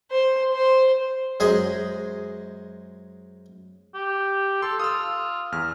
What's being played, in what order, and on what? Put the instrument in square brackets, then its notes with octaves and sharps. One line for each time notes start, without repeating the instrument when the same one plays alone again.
[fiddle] C5
C5
[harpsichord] F#2 G#3 G#4 C5
[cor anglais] G4
[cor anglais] A4 [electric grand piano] C6
[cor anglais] F4 [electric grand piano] D#6 E6
[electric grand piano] E2 F6